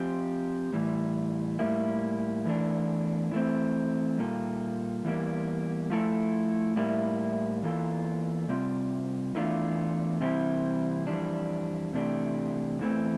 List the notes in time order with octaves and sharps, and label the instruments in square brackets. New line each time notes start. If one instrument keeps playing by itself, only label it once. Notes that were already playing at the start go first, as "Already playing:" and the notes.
Already playing: [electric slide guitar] F3 C4 G4
A2 E3 G3
A2 G3 A#3 E4
E2 E3 A3 D4
E3 A3 C4
A#2 G3 A#3 F4 A4
E2 E3 G3 A#3
F3 A3 E4 A4
A2 G3 A#3 E4
E2 E3 A#3 F4 A4
C3 G3 C4 F4
E2 E3 A3 D4 F4
C3 E3 G3 C4 E4
F2 E3 G3 D4
C3 E3 A3 D4 G4
E2 E3 A3 C4